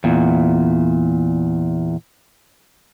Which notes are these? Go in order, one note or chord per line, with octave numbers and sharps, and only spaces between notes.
E2 A#2